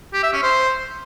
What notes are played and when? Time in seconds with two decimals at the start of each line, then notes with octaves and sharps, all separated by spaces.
0.13 G4
0.23 E5
0.33 C#4
0.43 C5